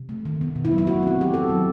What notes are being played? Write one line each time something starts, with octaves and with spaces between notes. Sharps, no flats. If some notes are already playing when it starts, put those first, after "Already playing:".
Already playing: C3
A3
D#3
B3
B2
E4
F#3
E4
A3 F#4
C4 F#4
A3 G4
F#3 A4
F#3